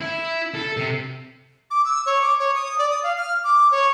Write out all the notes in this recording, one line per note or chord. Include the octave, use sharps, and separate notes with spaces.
E4
A4
C3
D6
E6
C#5
D6
C#5
D#6
D5
D#6
F5
F6
D6
C#5